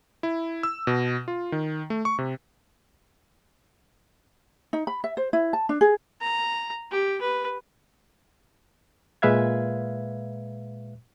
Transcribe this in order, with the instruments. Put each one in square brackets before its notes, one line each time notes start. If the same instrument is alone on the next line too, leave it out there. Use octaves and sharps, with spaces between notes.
[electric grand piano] E4
E6
B2
F4
D#3
A3
C#6
C3
[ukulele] D#4
B5
E5
C5
E4
A5
D4
G#4
[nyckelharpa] A#5
G4
B4
[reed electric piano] A#2 G#3 B4 E5 F5 G#6